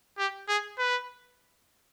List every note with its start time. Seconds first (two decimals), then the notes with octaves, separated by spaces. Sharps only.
0.18 G4
0.48 G#4
0.78 B4